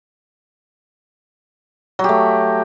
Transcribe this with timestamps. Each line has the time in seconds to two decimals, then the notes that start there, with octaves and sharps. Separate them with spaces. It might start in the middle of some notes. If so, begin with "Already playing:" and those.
1.99 F#3
2.04 G4
2.09 A3